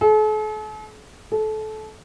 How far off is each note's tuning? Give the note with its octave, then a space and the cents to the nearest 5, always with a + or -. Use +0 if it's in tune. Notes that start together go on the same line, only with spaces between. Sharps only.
A4 -45
A4 -25